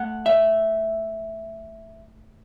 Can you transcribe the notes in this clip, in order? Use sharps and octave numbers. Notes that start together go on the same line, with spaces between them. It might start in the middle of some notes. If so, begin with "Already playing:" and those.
Already playing: A3 F#5
E5